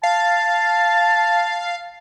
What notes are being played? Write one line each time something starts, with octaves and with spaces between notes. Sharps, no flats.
F5 A5